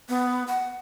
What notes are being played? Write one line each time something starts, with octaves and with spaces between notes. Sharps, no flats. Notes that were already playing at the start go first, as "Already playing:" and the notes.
B3
F#5